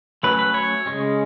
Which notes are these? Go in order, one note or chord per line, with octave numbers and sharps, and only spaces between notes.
F#3 A3 C#4 B4
B4
C#5
C#3 G#3 C#4